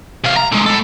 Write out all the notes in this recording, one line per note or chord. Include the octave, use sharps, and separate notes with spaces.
C3 F5
A#5
D3 G#3
A2 A4